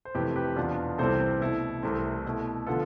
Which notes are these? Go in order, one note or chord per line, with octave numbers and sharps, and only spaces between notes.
C5
F2 C3 E3 A3 G4 B4
G4 B4
E2 B2 B3 D4 F4
C2 C3 E3 G3 C4 A4 C5
B2 A3 E4 A4
C2 C3 E3 A3 C4
B2 A3 E4
D3 F3 B3 F4 A4